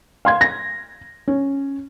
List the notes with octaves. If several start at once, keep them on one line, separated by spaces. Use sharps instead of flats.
F5 C6 G#6
A#6
C#4